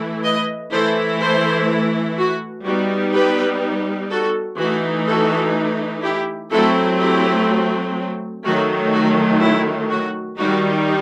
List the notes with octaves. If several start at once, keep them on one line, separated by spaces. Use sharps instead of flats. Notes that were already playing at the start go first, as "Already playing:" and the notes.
Already playing: E3 A3 E4
B4 D#5
E3 A3 E4 A4 C5
A4 C5
F#4
G3 B3 D#4 F#4
G4 B4
F#4 A4
E3 A3 D#4 F#4
F#4 A4
E4 G4
F#3 A3 C4 E4 F#4 A4
E4 G4
D#3 F#3 A3 F#4
F#4
E4
F#4
D#3 G3 D#4 F#4